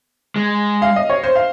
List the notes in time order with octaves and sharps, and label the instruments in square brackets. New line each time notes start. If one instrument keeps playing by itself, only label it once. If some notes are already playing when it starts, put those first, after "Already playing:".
[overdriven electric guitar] G#3
[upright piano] F5
D#5
C#5
C5
F5